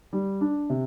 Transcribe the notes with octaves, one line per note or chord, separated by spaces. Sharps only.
G3
D4
C3